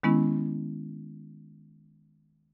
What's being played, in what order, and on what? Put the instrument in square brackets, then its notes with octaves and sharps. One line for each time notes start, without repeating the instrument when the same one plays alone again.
[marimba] D#3 G#3 B3 C#4 E4